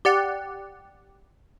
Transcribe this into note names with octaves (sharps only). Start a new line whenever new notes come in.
G4 D5 F#5